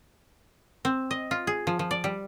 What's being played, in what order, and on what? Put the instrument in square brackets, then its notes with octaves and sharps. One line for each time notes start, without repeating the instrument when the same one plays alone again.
[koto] C4
D#5
F4
G#4
F3
F3
D5
G3